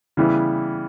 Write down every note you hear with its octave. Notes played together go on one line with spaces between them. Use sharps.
C#3 E3 G3 B3 E4